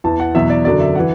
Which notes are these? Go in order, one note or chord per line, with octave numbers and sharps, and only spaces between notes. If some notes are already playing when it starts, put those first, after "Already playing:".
E2 E3 A5
F#5
E2 B2 F#3 E5
D5
F#2 D3 F#3 D5
E5
E3 F#5